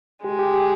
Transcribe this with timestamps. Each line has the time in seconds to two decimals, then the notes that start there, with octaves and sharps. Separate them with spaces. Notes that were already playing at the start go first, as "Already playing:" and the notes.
0.24 G#3 G4
0.39 G4
0.54 G4